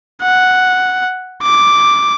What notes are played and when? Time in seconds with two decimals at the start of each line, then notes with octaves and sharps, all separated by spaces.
0.22 F#5
1.43 D6